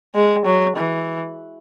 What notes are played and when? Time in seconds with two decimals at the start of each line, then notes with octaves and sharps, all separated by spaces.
0.15 G#3
0.46 F#3
0.77 E3